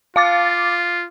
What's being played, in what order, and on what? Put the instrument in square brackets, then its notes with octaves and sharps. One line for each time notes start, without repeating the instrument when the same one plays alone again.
[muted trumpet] F4 [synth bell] F5 D6 A6